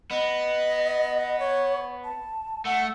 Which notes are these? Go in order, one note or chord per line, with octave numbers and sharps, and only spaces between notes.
B3 D#5
C#5
A5
A3 F#5